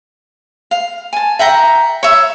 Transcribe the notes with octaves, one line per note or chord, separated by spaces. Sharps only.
F5
G#5 A5
E5 F#5 G5 A#5
C#5 E5